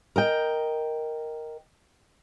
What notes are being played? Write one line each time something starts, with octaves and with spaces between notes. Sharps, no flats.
A#4 D#5 G5